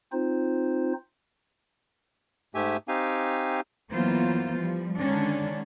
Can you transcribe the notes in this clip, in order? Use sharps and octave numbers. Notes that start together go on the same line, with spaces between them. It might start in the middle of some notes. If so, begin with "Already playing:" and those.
C4 D#4 F4 C5
G#2 A3 G4 E5 G#5
C4 D#4 G4 F5 G#5
E3 F#3 A#3 B3 F4 C5
F3 G3
D3 D#3 G#3 C#4 D4